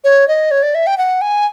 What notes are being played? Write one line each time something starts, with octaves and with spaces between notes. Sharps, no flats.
C#5
D#5
C#5
D5
E5
G5
F#5
G#5